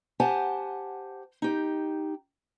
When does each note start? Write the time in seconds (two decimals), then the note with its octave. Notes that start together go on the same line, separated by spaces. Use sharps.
0.20 G4 C5 F#5 G#5 A5
1.42 D#4 G4